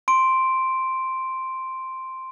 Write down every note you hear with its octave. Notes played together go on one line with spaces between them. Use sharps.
C6 D7